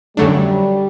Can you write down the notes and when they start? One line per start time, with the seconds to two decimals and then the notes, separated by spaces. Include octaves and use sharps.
0.17 F#2 D3 F#3 G3 A3 D4